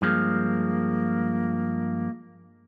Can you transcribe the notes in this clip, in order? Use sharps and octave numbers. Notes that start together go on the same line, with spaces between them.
G2 F3 G#3 A#3